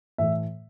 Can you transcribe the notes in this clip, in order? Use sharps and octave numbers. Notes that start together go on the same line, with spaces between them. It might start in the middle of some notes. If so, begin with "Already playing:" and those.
A2 E3 A3 E5